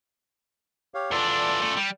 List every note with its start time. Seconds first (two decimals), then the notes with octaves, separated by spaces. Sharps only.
0.94 G4 C#5 F5
1.11 E2 D4 F4 A4 D5
1.62 C#3 A3
1.77 G3